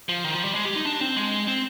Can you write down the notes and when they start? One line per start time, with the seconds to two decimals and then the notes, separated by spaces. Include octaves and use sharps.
0.09 F3
0.24 D#3
0.34 F3
0.45 G3
0.55 G#3
0.65 G4
0.75 D#4
0.86 D4
1.01 C4
1.16 G#3
1.47 C4